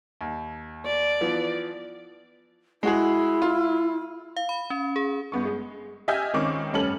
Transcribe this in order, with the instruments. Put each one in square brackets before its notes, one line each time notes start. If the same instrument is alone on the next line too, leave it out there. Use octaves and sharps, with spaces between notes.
[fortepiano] D#2
[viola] D5
[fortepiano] E3 F3 B3
[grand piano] G#3 F#4 G#4 [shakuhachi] E4
[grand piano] F4
[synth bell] F5
B5
C#4
G#4
[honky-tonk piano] G1 B3 C#6
G#3
G4 D#5 E5 G#5 F6 G6
C#2 D#3 C4 C#4 C#6 D6
F1 G2 C#4 A4 F6 F#7